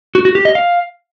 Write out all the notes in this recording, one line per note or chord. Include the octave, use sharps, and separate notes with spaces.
F#4
F#4
G4
D#5
F5